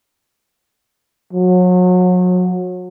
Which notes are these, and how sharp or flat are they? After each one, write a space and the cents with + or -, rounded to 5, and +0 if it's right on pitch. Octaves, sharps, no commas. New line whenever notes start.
F#3 -35